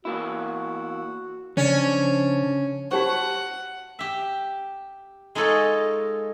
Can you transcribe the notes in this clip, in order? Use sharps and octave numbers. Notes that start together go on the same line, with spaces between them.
E2 A#3 E4 F#4
C#3 F3 C#4 D4
F#4 G4 C5 C#5 F#5 A5 C#6
G4 E5
G#3 D#4 F4 A4 C#5 D#5